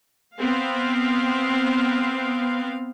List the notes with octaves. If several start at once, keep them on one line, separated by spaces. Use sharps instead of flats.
B3 C4 F5